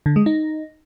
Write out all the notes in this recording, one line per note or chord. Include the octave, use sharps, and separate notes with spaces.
D3
G#3
D#4